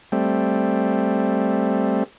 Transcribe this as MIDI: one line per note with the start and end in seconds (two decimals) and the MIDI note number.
0.12 2.04 55
0.12 2.04 57
0.12 2.04 60